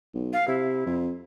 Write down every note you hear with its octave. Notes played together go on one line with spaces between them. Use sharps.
B1
F5
C3 E4
F2